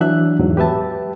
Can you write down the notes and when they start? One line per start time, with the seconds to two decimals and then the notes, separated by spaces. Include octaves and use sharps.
0.01 E3 F#3 D4 E5 F#6
0.39 E2 G#2 F#3
0.57 G4 B4 E5 A5